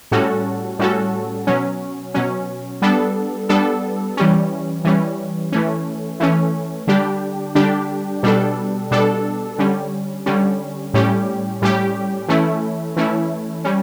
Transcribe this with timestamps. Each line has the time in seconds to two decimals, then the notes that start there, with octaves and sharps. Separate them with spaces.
0.11 A2 G3 C#4 F#4 A4
0.79 A2 G3 C#4 F#4 A4
1.47 B2 F#3 C#4
2.14 B2 F#3 C#4
2.82 G3 B3 D4 A4
3.49 G3 B3 D4 A4
4.17 E3 G3 C#4
4.84 E3 G3 C#4
5.52 E3 A3 C#4
6.20 E3 A3 C#4
6.87 D3 G3 D4 G4
7.55 D3 G3 D4 G4
8.23 B2 G3 D4 A4
8.91 B2 G3 D4 A4
9.58 D3 G3 C#4
10.26 D3 G3 C#4
10.94 A2 G3 C#4 G4
11.62 A2 G3 C#4 G4
12.28 E3 A3 C#4 E4
12.96 E3 A3 C#4 E4
13.64 G3 C#4